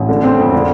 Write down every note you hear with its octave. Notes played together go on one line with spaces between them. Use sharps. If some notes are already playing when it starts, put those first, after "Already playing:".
Already playing: A1
D3
C4
F2
D3